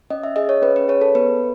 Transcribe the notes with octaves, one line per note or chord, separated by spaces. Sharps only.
C#4 D#5
E5
G#4 D#5
C#5
C#4 B4
B4
G#4 C#5
A4
B3 B4